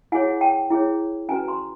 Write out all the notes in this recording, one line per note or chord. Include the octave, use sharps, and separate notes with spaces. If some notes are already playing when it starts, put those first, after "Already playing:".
E4 G#4 C#5 F#5 G#5
G5 A5
E4 G#4 C#5
C#4 F#4 B4 G#5 A#5
A#5 C6